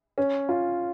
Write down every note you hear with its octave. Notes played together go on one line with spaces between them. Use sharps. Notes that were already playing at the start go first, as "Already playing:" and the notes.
C#4
F4